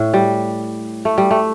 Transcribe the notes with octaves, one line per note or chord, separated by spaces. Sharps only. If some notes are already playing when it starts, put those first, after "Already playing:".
Already playing: A2
G3
A3
G3
A3